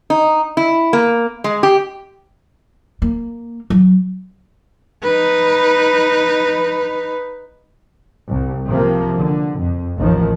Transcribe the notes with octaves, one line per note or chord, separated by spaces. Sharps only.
D#4
E4
A#3
G#3
G4
A#3
F#3
D#4 B4
C2
C3 F3 A#3
D3
F2
A1 D#2 D#3 F3